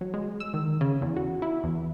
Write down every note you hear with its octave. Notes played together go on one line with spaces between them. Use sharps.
F#3
G#3
E6
D#3
C#3
E2
F#4
E4
E2